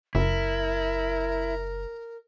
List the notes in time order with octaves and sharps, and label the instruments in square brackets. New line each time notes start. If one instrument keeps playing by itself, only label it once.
[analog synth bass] F#1 [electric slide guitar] E4 [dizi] A#4